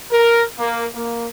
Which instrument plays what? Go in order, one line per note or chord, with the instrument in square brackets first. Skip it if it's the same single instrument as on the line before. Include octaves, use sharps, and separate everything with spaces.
[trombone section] A#4
A#3
A#3